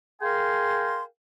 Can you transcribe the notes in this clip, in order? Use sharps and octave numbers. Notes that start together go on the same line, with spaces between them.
G#4 A#4 F5 G5 G#5 C6